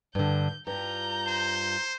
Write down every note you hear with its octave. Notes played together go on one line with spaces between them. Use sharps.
G2 D3 G6
G2 F4 A#5 G6
C5